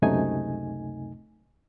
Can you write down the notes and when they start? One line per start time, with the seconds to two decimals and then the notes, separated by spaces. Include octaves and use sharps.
0.02 C#2 F#2 C3 A3 D#4 G#5